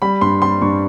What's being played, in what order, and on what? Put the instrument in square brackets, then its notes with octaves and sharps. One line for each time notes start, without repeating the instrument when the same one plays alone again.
[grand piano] G3 B5
G2 C6
G3 C6
G2 C#6